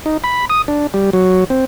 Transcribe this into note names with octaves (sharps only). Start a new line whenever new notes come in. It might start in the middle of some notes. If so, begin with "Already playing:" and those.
D#4
B5
D#6
D4
G3
F#3
C4